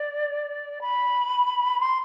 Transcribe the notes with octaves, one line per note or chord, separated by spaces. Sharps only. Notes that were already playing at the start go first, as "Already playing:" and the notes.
Already playing: D5
B5
C6